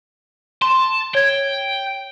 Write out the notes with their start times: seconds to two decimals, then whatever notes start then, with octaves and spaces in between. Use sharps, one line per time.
0.62 A5 C6
1.15 C#5 G5 G#6